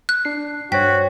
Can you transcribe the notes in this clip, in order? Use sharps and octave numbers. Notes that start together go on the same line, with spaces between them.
F#6
D4 C7
G2 F#4 C5 C#5 G5 B6